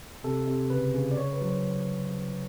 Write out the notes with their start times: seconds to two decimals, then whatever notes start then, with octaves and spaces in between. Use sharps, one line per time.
0.24 C3 A4
0.47 C3
0.70 C#3 B4
0.95 C#3
1.11 D5
1.17 C#3 C#5
1.33 B4
1.41 F#3
1.48 C5